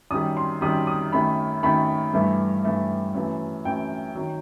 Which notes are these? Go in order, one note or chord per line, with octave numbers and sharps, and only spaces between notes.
F#2 D#3 G3 D#6
C6
F#2 D#3 G3 D#6
D#6
F#2 D#3 A3 B5
F#2 D#3 A3 B5
G2 E3 A3
G2 E3 A3
F#2 E3 A3
F#2 E3 A3 G5
D#3 F#3